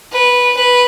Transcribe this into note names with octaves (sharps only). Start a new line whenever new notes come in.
B4
B4